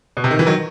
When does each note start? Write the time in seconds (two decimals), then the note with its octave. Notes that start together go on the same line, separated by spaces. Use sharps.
0.17 B2
0.24 C3
0.31 D#3
0.39 E3
0.46 D#3 F#3